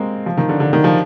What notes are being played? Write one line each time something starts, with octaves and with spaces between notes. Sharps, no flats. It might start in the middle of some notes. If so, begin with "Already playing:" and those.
Already playing: G#3 A#3 C4
F3
D#3
D3
D3
D#3
F3